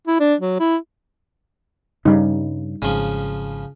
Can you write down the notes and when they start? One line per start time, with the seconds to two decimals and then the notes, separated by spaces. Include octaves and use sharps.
0.07 E4
0.20 D4
0.41 F#3
0.60 E4
2.05 G2 C#3 G3 D#4
2.82 G#1 C#3 F3